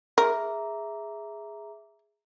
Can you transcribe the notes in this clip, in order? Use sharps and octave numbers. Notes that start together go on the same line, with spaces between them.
G#4 A#4 E5 A#5